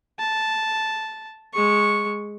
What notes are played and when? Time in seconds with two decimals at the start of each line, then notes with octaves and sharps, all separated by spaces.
0.19 A5
1.54 G#3 C#6